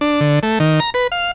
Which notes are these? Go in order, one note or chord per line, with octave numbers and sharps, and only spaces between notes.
D4
D3
A3
D#3
A#5
B4
F5